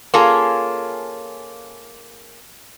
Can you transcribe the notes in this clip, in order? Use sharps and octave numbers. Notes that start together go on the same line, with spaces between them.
A#3 C#4 F4 G#4 A4